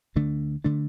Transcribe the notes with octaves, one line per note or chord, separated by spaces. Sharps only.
D2 D3 A3 D4
D3 A3 D4